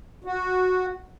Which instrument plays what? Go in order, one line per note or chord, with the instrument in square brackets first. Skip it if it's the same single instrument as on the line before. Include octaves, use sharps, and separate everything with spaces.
[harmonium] F#4